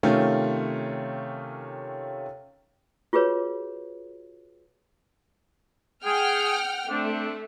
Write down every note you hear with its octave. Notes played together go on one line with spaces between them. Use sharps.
C3 D#3 A3 C#4 F4
F4 F#4 G#4 B4 C#5
G#4 F#5 G5 F6
A3 C4 D4